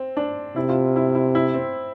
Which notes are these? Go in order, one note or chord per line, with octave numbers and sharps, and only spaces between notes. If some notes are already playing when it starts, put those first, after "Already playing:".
Already playing: C4
D4
C3 E4
F4
E4
E4
E4
C4